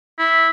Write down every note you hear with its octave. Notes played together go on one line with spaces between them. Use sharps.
E4